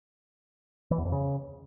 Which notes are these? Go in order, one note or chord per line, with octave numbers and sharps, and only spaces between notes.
E3
E2
F2
C#3